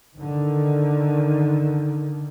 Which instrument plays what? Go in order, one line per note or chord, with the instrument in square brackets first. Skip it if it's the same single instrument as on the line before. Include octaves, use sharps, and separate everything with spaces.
[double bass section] D3 D#3